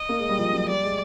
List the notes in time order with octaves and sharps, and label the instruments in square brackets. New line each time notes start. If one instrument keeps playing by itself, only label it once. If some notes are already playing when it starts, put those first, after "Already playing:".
Already playing: [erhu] D#5
[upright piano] A#3
G#3
G3
F3
F#3
[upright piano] G3 [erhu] D5
[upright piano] G#3